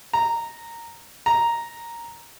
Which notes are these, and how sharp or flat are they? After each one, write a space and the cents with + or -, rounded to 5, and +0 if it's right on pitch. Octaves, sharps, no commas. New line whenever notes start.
A#5 -10
A#5 +0